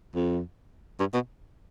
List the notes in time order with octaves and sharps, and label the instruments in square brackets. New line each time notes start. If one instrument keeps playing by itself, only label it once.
[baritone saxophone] F2
G2
B2